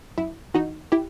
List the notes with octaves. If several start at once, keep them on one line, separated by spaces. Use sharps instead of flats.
F#2 E4
E3 D#4 F#4
E4 G4